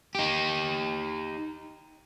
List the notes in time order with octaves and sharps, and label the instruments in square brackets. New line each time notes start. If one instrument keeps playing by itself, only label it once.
[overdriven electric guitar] D#4 G4